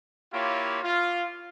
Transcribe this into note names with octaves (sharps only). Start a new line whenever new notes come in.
A#3 E4 F4 G4 C#5
F4